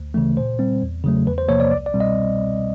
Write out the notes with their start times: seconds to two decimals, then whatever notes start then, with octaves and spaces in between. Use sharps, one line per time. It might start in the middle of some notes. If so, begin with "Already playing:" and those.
Already playing: D2
0.14 C#3 E3 A3
0.37 A#2 C5
0.59 G3 C4
0.82 E2
1.04 C#3 F#3 A3
1.27 E2 B4
1.38 C5
1.48 C3 F3 A#3 C#5
1.60 D5
1.71 C2 D5
1.86 D5
1.94 B2 G3 C4
2.00 D#5